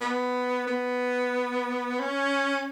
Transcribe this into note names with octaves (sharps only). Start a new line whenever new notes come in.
B3
B3
C#4